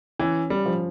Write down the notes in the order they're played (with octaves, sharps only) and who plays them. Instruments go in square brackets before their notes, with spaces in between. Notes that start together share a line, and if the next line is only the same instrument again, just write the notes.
[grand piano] E3 [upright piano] C#4
[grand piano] G3
[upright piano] F3